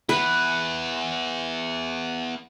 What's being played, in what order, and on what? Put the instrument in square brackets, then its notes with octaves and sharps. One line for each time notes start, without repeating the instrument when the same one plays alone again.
[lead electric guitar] B3 E4 [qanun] B4